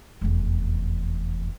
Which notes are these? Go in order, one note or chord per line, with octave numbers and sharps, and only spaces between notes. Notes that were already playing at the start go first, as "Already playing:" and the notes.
F1 E2